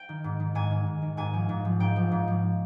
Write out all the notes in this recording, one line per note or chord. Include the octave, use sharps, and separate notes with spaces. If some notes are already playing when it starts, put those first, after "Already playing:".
Already playing: G5
D#3
G#2
D#3
G#2 G#5
D#3
G#2
D#3
G#2 G#5
F3
G#2
F3
G#2 G5
F3
G#2
F3